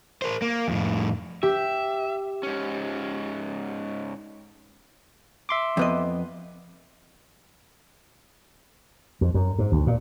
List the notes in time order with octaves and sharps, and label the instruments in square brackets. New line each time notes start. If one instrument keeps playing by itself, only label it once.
[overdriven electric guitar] A#4 C5
A#3
F2 A2
[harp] G4 [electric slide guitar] E5
[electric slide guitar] G#2 C#4
[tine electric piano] E5 C6 D6
[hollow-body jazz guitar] F2 B3 D#5
[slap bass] F2
F#2
G#2
D2
A#2